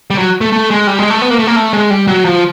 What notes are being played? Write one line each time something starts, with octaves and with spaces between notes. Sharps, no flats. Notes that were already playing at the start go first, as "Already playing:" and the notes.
G3
F#3
A3
A3
G#3
G3
G#3
A3
B3
A#3
A3
A#3
A3
G#3
G3
F#3
F3